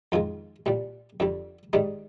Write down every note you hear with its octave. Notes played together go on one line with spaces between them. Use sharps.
F2 D#3 G#3 F4
C2 A#2 G3
F2 D3 G3
G#2 D#3 G3 D#4